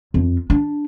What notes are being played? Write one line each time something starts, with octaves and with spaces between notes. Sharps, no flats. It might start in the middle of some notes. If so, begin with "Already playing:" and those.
F2
D4